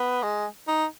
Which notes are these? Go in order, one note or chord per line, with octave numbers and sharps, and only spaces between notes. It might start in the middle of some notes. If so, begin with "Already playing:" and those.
Already playing: B3
G#3
D#4